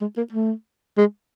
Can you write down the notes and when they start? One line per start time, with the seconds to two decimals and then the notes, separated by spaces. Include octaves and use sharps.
0.01 G#3
0.17 A#3
0.32 A3
0.97 G#3